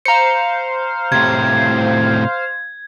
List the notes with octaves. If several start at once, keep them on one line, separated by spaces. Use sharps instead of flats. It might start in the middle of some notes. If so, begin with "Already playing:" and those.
C5 F5 A#5 C#7
A2 C3 G#6